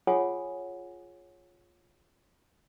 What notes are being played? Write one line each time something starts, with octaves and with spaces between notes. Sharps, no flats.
F4 G#4 C#5 F#5 G#5 D#6